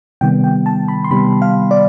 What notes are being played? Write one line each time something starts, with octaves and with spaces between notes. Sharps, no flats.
C3 D#3 G3 B3 G5
G5
A5
B5
C6
C3 D#3 G3 B3 B5
F5
D5